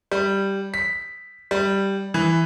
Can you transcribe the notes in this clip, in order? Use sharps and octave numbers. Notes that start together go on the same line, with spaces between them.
G3
B6
G3
E3